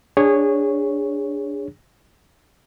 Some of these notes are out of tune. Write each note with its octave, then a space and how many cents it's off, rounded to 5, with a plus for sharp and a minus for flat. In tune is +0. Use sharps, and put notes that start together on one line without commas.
D4 -5 G#4 -20 C#5 +0